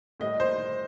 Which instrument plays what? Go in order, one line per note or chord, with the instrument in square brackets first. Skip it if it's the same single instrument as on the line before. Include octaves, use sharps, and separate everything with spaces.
[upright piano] A2 G3 D#5
C5